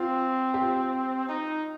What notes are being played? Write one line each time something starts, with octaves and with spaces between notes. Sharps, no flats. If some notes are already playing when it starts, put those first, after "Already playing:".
Already playing: C4 F4
G4
F4
D#4